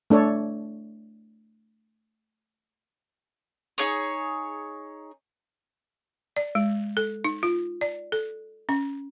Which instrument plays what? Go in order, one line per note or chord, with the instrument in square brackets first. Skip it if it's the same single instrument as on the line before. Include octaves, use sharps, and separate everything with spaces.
[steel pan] A3 D4 A4 C#5
[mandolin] D#4 G#4 C#5
[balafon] D5
G#3
A4
D#4
F4
D5
A4
C#4